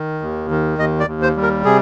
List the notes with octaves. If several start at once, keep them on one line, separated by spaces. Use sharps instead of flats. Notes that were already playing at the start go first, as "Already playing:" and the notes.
Already playing: D#3
D#2
D#3
D#2 D#5
D5
D#2
C5
G3
A#4
C3 G#4